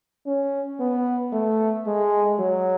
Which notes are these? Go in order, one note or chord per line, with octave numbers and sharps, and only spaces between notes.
C#4
B3
A3
G#3
F#3